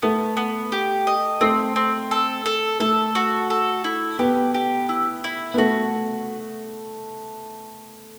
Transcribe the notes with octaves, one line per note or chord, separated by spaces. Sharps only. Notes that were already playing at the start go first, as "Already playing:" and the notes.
A3 B3
B3
G4
D#5
A3 C4
C4
A4
A4
A3 A4
F#4
A4
E4
B3 G4
G4
E4
E4
B3
A3 F#4